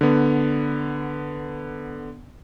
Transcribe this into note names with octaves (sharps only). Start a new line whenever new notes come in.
D3 B3